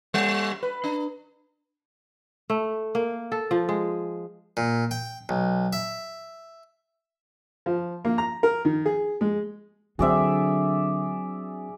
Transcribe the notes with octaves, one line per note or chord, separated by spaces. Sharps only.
G3
B4
D4
A3
A#3
A4
F3
G#3
A#2
G5
B1
E5
F3
A#3
A#5
A#4
D#3
G#4
G#3
D3 F#3 C4 D4 F#4 G#4 D5 E5